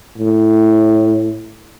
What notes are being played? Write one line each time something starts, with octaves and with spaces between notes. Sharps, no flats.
A2